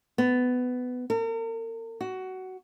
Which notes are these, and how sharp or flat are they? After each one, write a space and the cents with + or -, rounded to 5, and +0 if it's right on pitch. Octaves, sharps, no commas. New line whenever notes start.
B3 +15
A#4 -40
F#4 +15